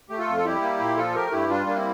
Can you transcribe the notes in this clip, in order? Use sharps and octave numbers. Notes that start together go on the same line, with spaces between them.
A3 G4
F4 A4
F2
A4
G3 E4 G4
A#3
A#2
F3 F4 A4
A3 G4 A#4
G2 E4 G4
G3 D4 F4
A#3 D4
C4 E4